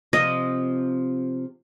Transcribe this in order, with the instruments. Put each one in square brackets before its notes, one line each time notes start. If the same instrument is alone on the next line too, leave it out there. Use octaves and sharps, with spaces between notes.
[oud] C3 F3 [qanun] D#5